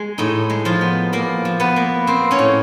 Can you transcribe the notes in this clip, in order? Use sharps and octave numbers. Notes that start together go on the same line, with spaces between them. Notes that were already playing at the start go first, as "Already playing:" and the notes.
Already playing: G#3
A2 D#4
G#3
F3 F4
B3
F3 A#3 A#4
F3
B3 B4
A#3
A#3 C4 C5
C#4 C#5
A2